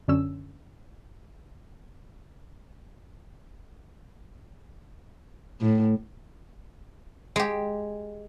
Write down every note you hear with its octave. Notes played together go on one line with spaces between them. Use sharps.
F#2 D3 C#4 E6
A2
G#3 G4